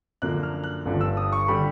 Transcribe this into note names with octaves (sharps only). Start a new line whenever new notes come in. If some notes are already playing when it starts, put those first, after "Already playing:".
F#2 D3 F3 A#3 F#6
F6
F#6
G1 G2 D3 F3
E6
D#6
C#6
D3 G3 B5